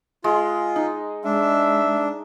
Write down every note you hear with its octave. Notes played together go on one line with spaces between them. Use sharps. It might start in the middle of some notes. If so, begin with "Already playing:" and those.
G#3 F4
D#4
G#3 D4 E5